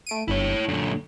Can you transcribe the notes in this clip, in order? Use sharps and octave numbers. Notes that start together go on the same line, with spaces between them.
A3 D7 D#7
G1 G2 E4 C#5
F#2 A#2 D3